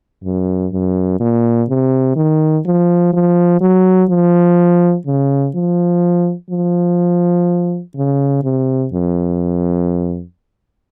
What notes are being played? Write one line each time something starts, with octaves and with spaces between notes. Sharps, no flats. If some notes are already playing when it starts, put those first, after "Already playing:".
F#2
F#2
A#2
C3
D#3
F3
F3
F#3
F3
C#3
F3
F3
C#3
C3
F2